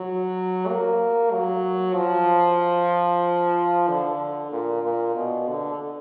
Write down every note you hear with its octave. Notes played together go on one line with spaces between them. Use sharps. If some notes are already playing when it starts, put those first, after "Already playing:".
Already playing: F#3
A#3
F#3
F3
D3
A#2
A#2
B2
D3